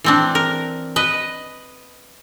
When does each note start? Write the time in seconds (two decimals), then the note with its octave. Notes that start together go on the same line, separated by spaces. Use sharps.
0.04 E3 C4 D4
0.35 A#4
0.96 B4 D#5